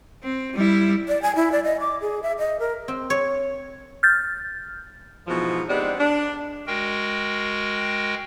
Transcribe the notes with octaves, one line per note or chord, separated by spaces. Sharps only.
C4
G3 E4
D5
G#5
E4
D5
D#5
D6
G#4
E5
D#5
A#4
C4
C#5
F6 G6 A6
G#2 B2 E3 F3
G#3 B3 C4 D4 D#4 G4
D4
G#3 F#4 A#4 G5